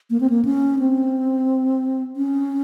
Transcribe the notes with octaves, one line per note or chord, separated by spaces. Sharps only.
A#3
C4
A#3
C#4
C4
C#4